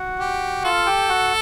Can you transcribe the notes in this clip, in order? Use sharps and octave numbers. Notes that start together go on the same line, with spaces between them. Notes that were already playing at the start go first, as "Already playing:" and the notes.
Already playing: F#4 F#5
G4
F4 A4 F5
G4 G5
F#4 F#5